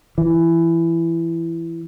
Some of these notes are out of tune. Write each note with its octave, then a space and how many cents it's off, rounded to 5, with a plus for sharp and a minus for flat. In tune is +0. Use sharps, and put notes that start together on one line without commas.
E3 +15